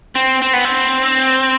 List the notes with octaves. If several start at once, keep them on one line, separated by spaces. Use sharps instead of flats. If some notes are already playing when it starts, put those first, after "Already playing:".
C4
C4
B3
C4